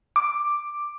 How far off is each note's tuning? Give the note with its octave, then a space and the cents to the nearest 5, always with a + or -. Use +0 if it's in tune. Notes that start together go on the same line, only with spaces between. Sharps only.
D6 +5